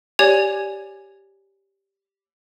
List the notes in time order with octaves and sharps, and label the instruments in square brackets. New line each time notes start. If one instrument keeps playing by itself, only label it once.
[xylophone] G4 C#5 D5 G#5 G#6 F7